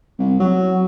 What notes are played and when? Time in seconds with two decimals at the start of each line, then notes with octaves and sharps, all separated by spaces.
0.18 C2
0.40 F#3